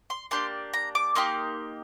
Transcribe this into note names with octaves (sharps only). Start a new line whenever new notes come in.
C6
A#3 D4 G4 C6
A#5
D6
A#3 D#4 G4 C6